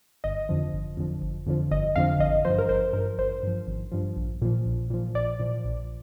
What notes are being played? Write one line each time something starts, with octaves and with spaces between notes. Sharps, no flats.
G1 D#5
F2 D3 F3
G1
F2 D3 F3
G1
F2 D3 F3
G1 D#5
F2 D3 F3 F5
G#1 D#5
G2 F3 C5
A#4
G#1 C5
G2 F3 A#4
G#1 C5
G2 F3
G#1
G2 F3
A#1
A#2 F3
A#1
A#2 F3
A#1 D5
A#2 F3
A#1